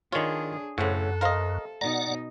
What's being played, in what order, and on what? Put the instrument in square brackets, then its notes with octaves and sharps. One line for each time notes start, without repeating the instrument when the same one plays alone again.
[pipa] D3 C#5 [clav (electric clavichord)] D#3 F4 [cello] D4 G#4
[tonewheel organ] F#2 [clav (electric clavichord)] A2 C#3 [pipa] B3 C4 F#4 [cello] A4
[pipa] C3 C5 F5 [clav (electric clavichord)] A#4 D#5
[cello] B2 D#4 [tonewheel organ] D5 F#5 [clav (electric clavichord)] A#5